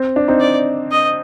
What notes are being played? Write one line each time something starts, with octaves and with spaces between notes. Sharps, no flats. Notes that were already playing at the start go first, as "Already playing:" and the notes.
Already playing: C4
D4
C4 D#4
D5
D#5